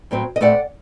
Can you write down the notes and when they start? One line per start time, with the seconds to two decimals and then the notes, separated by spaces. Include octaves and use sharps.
0.11 A2 F#3 C4
0.36 D#5
0.41 A2 A3 C4 D5 F#5